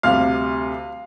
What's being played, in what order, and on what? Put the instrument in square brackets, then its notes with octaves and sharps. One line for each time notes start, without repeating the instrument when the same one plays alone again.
[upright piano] D2 C3 G3 F5